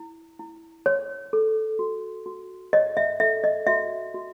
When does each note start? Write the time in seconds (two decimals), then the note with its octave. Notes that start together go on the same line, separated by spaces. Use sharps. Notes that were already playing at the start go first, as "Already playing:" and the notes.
Already playing: E4
0.39 E4
0.86 C#5
1.33 A4
1.79 F#4
2.26 F#4
2.73 C#5 D#5
2.97 E5
3.20 A4 E5
3.44 D#5
3.67 F#4 E5
4.14 F#4